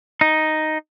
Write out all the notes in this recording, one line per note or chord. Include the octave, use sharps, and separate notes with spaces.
D#4